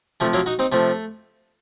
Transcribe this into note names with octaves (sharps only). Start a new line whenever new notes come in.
C3 F3 A3
F#3 A#3
D#4 F#4
C4 D#4
C3 F3 A3